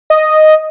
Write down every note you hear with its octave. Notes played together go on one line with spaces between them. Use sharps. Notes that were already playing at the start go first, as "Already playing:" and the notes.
D#5